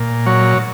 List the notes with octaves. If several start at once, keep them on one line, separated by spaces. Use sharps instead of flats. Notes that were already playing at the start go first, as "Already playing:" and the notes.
Already playing: A#2
F#3 C#5